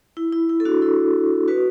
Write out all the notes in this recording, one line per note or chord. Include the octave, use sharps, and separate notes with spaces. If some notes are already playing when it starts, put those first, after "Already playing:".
E4
E4
E4
A4
D4 F#4
E4 A4
F#4 B4